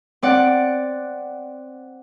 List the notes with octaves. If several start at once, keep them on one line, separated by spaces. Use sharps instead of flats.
C4 D5 F#5